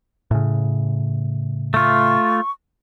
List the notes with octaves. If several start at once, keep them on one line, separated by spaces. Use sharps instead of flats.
A2 C#3
A3 F4 C#6